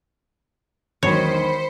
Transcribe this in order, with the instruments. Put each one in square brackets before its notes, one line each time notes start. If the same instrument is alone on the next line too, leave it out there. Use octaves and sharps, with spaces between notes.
[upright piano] E1 B1 [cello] D#3 [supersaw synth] C5 B5 C#7 [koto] C#5